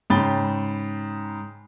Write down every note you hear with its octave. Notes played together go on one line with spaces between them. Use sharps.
G#2 C#3 G5 B5 A6 G7